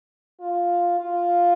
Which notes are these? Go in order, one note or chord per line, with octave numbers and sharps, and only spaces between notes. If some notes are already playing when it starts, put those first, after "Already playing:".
F4
F4